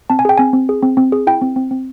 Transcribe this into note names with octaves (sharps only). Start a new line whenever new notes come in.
C4 A5
G#5
G#4 G5
C4 G#5
C4
G#4
C4
C4
G#4
E4 G5
C4
C4
C4